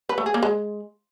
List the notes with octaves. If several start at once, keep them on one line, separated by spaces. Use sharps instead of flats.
B4
A3
G#4
A#3
G#3